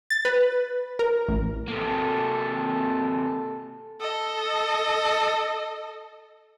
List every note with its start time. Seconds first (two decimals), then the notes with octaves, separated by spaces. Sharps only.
0.10 A6
0.25 B4
0.99 A#4
1.28 A1
1.68 C3 A#3 A4
4.00 A4 D#5